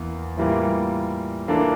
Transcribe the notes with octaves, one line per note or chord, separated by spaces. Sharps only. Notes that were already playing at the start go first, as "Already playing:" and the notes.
Already playing: E2 E3 A#3
A2 E3 G3 A#3 F4
E3 A#3 D4 F4 A4